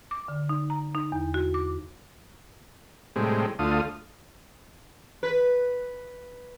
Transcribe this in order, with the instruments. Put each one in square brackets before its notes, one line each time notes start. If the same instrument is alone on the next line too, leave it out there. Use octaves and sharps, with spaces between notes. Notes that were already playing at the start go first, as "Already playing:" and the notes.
[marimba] D6
D3
D#4
A#5
D#4
E2
F#4
D6
[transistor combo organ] A2 C3 G3 G#3
D2 A3 F4 D#6
[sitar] B4